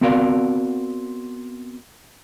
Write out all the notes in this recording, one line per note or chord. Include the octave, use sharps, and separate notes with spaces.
B3 C4 F#4 A#4 D5 F5